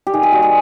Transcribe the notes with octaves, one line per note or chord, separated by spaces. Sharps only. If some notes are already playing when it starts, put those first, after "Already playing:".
G4
D#3 G#4
G4
G3 A#3 F#4
G#4